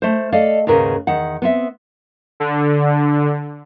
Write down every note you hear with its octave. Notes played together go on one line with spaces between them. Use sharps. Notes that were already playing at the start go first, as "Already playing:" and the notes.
A3 C5
A4 D5 D#5 F5
D#2 G#2 C#3 A#4 B4
E2 D#3 F#5
B3 C4 E5
D3